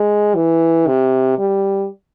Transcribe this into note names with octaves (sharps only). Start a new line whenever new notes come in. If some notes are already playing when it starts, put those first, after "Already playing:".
Already playing: G#3
E3
C3
G3